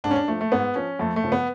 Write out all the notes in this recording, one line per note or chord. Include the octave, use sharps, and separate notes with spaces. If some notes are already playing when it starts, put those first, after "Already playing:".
G#2 D4
C#4
D4
F3 A3
A3
G#2 B3
F3 C#4
F2 A3
A3
C#3 F3
B3